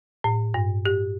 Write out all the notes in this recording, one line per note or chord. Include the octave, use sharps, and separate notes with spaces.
A2
G2
G4